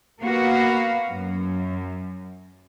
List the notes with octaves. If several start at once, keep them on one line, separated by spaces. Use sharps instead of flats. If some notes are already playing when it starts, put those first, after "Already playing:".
A#3 B3 F#4 B4 F5
F#2